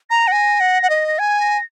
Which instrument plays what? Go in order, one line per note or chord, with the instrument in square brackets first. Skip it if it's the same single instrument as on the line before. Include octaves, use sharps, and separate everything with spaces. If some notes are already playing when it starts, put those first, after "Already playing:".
[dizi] A#5 [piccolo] A#6
[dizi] F#5
G#5
F#5
F#5
D#5
[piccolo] A#6
[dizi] G#5 [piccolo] G#6
[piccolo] A#6